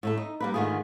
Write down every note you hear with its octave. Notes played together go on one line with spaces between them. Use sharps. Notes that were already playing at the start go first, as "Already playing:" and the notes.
A2 A3 A4
D#4
G3 A#3 B4
G#2 D3 D#3 A3 F4 G#4